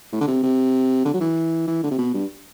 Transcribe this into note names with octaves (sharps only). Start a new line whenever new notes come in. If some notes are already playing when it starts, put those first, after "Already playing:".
A2
D3
C3
C3
D3
F#3
E3
E3
D3
C3
B2
G2